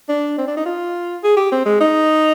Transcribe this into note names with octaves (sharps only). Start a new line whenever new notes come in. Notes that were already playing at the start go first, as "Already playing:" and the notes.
D4
C4
D4
D#4
F4
G#4
G4
C4
G#3
D#4